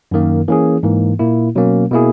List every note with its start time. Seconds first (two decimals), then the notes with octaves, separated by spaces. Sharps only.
0.11 F#2 D#3 A#3
0.48 E3 A#3 C#4 G#4
0.83 G#2 E3 A#3
1.19 A#2 A#3 E4
1.56 B2 F#3 A#3 C#4
1.91 B2 A#3 E4 G#4